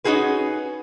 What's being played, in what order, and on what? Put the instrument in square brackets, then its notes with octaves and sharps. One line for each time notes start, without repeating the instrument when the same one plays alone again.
[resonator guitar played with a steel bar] C#4 D#4 F#4 G#4 B4